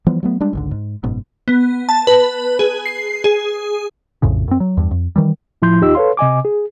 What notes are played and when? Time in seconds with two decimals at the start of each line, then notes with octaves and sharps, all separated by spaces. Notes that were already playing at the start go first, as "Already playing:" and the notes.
0.06 E3 F3 G3 B3
0.23 F#3 A3 B3
0.40 G3 G#3 D4
0.53 G#1 C#2 D3
0.71 G#2
1.04 F#1 G#2 B2
1.48 B3
1.89 A5
2.07 B4
2.59 G#4
2.86 C7
3.24 G#4
4.22 A#1 F2 A2 C#3
4.48 F#2 C4
4.60 F#3
4.77 E2 G2
4.91 F2
5.16 D#3 E3 G3
5.62 A2 F3 E4 C6 G6
5.81 D#2 D#4 F4 G4 D#5 E6
5.95 A4 B4 C#5 F5 C6
6.17 C3 D#5 G#5 D6
6.45 G#4